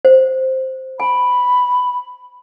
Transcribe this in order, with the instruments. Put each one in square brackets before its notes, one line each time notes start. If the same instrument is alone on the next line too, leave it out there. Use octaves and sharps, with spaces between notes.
[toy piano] C5
[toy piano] G#5 [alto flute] B5